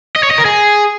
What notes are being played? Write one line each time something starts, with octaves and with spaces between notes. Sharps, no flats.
D#5
C#5
D#5
A#4
G#4